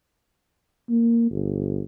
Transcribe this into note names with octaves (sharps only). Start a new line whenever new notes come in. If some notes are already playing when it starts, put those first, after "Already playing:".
A#3
G1